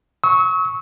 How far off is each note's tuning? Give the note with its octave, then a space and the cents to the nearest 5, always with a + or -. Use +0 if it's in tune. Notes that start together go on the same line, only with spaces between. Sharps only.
C#6 +0 E6 -45